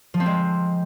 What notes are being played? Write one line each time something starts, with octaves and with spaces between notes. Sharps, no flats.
F3
C4
G#3